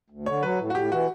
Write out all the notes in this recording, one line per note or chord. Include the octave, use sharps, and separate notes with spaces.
D2
D3 C#5
F#3 B4
A2
F#4
A2 G4
E3 F#4